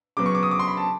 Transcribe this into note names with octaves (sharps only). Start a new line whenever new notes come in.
C#3 F#3 B3 D6
C#6
D6
D#6
D6
C6
B5
A5